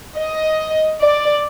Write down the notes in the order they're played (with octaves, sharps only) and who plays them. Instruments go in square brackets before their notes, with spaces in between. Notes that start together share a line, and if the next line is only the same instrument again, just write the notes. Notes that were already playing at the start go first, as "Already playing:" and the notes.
[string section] D#5
D5